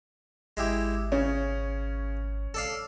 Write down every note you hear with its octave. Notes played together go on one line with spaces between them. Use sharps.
G#1 G#3 E4 G4
C#3 C#4
A4 D5 F5